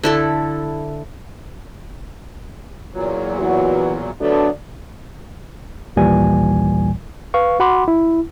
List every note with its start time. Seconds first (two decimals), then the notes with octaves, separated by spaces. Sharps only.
0.03 D3 E4 A4
2.93 E2 A#2 F#3
3.39 E3 F#4
4.20 D3 F#3 A3 B3 D4
5.96 A#1 D#2 A#2 E3 G3 G#5
7.34 B4 F5 C#6
7.60 F#4 F#5 B5 C6 D6
7.88 E4